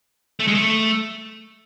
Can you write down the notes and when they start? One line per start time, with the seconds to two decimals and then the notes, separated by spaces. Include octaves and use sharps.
0.40 A3
0.47 G#3
0.55 A3